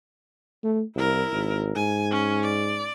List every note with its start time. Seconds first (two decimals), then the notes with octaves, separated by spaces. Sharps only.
0.63 A3
0.96 C2 E4 A#4
1.32 G#1
1.76 G#2 G#5
2.11 C#4
2.43 D5